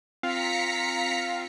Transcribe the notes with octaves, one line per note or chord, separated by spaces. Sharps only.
C4 F4 F5 A#5 B6 C#7